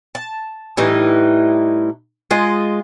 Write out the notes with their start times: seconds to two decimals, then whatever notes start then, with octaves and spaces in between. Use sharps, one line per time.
0.15 A5
0.77 A2 E3 G3 D#4
2.31 G#3 F4 D#5